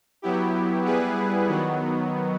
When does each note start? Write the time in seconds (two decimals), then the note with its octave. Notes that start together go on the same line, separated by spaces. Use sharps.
0.22 F#3 B3 E4 G4
0.85 G3 B3 E4 G#4 B4
1.48 D#3 F#3 B3